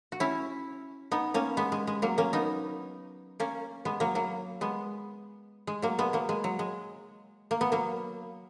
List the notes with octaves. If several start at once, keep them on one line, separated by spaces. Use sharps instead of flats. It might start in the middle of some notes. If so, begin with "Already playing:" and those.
F#4
C#4 E4
B3 D#4
A#3 C#4
G#3 B3
G#3
G#3
F#3 A#3
A#3 C#4
B3 D#4
A#3 C#4
G#3 B3
F#3 A#3
F#3 A#3
G#3 B3
G#3
F#3 A#3
G#3 B3
F#3 A#3
G#3
F#3
G#3
A#3
B3
F#3 A#3